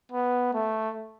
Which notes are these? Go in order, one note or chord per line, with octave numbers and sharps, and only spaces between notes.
B3
A3